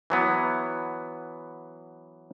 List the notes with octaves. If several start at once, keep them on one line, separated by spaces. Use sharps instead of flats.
E3 F#3 B3